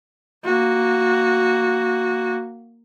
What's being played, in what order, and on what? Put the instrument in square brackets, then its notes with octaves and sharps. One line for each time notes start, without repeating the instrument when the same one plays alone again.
[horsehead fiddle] A#3 F#4